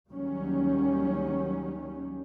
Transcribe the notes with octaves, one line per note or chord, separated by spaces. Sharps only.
D2 D#3 F#3 G3 A#3 C#4